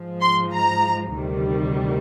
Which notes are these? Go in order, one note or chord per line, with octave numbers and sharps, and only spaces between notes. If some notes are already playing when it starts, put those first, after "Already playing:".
Already playing: G#2 F3 G#3
C6
A#5
D2 C3 D#3 G3